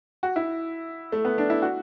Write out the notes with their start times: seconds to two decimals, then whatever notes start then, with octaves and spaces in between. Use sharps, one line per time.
0.23 F#4
0.36 E4
1.12 A3
1.25 B3
1.38 D4
1.50 E4
1.62 F#4